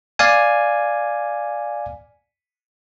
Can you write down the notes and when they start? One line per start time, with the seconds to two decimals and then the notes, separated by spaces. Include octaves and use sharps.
0.19 D5 F5 G#5